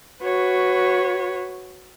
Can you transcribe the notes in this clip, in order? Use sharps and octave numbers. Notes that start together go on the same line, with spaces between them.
F#4 B4 C#5